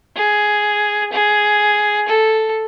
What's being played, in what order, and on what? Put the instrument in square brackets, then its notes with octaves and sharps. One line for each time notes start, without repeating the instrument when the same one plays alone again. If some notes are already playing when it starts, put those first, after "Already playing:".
[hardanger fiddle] G#4
G#4
A4